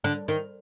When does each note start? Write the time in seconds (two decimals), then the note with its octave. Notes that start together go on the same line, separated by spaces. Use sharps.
0.04 D3
0.28 D#3